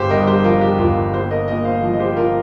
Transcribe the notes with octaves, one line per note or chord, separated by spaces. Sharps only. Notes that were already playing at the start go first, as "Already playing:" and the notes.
Already playing: G1 G4 C5
G2 A#4 D#5
G4 C5
F3 F4 A#4
G4
G1 F4 A#4
A#3 G4 C5
A#4 D#5
A#2 A#4 D#5
C5 F5
F3
D#5
G4 C5
F4 A#4